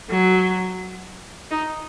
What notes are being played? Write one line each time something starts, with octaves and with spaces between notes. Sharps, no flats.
F#3
D#4